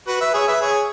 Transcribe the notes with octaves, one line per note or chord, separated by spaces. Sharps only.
F#4 B4
B4 E5
G#4 C#5
B4 E5
G#4 C#5